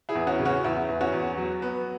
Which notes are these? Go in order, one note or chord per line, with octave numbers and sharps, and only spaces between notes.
E4 G#4
E2
C#4 F#4
C#3
C#4 F#4
E2 E4
E2
C#4 F#4
E2
F#3
B3